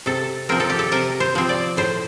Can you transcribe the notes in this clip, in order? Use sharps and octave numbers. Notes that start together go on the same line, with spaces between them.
C3 A4
F3 C4 A#4
A4
G4
A4
C3 A#4
C5
F3 C4
D5
A2 C5